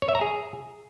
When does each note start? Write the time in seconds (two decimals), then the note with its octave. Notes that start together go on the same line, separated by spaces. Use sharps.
0.02 C#5
0.09 E5
0.15 A#5
0.21 G#4